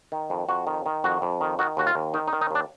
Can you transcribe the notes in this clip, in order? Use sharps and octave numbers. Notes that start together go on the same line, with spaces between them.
D#3
F2
F2 F#4
D#3
D#3
F2 F#4
F2
D#3
D#3 F#4
D#2 F#4
F4
D#2
D#3 D#4
D#4
D#3
D#4
D#2 D4